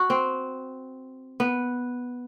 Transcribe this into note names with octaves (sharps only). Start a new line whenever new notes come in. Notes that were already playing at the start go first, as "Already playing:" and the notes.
Already playing: F#4
C4
B3